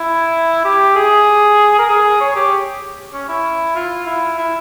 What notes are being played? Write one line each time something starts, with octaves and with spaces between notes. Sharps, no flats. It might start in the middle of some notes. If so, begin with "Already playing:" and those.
Already playing: E4
G4
G#4
A#4
G#4
C#5
G4
C#4
E4
F4
E4
E4